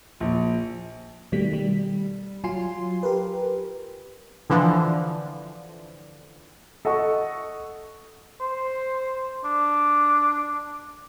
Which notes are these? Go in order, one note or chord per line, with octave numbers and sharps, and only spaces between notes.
A#1
B2 D#3 G3 A3 B6
G3
F#3 F4 G#5 C6 C7
G4 A#4 B4
D3 E3 F3
A4 D#5 F#5 C#6
C5
D4